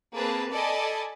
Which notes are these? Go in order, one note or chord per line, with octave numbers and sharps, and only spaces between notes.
A#3 C4 G#4 B4 A5
A4 D5 D#5 G#5 A5 B5